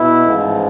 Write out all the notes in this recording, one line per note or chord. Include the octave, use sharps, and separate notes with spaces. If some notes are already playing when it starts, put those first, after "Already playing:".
Already playing: B2 E4
A1 G#2 F3